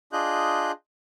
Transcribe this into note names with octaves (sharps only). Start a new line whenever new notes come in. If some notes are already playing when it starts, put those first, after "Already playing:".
D4 F4 G#4 D#5 F#6 G6